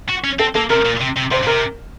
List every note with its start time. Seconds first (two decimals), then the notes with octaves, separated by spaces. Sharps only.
0.09 F#4
0.24 C#4
0.39 C4 A4
0.55 A#3 A4
0.70 C3 A#4
0.85 A#2
1.00 C3
1.16 C3
1.31 C3 C5
1.43 A#2
1.47 C3 A#4